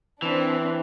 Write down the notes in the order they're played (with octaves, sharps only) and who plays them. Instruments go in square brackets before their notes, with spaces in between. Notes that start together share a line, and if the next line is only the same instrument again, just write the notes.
[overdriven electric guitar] E3 [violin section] C4 D4